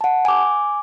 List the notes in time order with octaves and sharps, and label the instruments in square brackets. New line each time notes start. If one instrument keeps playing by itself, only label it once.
[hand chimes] F#5 A5
G#5 D6